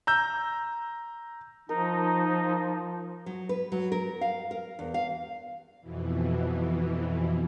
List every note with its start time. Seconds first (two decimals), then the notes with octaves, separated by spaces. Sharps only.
0.07 A#5 E6 G6
1.69 F3 D#4 A#4
3.26 F#3
3.49 B4
3.72 F#3
3.92 A#4
4.21 F5
4.51 A#4
4.79 E2
4.94 F5
5.81 F2 B2 E3